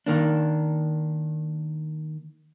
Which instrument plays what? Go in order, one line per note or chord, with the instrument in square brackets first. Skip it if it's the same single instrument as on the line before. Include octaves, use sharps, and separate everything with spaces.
[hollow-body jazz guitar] D#3 A#3 D4